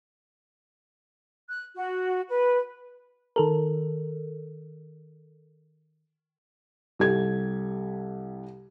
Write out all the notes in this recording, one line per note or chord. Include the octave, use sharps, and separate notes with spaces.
F#6
F#4
B4
D#3 A4 A#4
C2 G4 A4 G#6